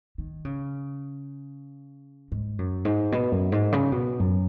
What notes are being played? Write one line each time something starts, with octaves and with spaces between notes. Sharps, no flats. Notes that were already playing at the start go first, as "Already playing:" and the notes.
D#3
C#3
G#2
F#2
G#2
B2
F#2
G#2
C#3
B2
F#2